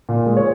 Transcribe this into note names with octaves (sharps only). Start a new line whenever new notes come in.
A#2
G#3
C#5